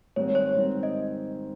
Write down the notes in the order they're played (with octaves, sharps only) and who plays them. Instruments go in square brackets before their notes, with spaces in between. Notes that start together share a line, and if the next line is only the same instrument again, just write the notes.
[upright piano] G#2 D#3 G3 C4 [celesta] C#5
[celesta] C#5
[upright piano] G#2 D#3 G3 C4
[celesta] D#5